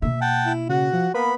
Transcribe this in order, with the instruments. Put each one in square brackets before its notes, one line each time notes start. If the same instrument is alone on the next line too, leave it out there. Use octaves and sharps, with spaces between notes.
[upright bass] B2 A#3 [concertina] E5
[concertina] F#5 G5 A5
[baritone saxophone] E4
[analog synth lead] C#3 [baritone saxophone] F#4 [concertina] F#5
[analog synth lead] F3
[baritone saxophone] A#3 [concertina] B3 B5 [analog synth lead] B4